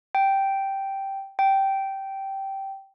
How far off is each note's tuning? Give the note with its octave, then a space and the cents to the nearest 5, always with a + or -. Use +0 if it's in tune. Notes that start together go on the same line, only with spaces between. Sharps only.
G5 -5
G5 -10